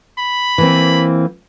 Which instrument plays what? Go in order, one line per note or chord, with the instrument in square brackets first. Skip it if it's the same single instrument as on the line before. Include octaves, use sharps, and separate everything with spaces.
[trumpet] B5
[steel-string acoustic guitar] E3 A#3 C4